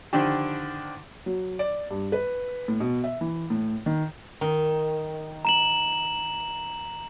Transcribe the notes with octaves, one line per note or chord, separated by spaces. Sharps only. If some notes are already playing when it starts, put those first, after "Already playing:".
D3 D#3 F3 D4 G4
F#3
D5
G2
B4
A2
B2
E5
E3
A2
D#3
D#3
A#5 E7 F#7